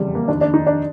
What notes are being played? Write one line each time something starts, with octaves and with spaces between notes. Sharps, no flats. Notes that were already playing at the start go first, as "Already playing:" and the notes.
Already playing: F1 E2 C#3 G3
A#3
F1 D#2 D#3 D4
D4
D#4
D4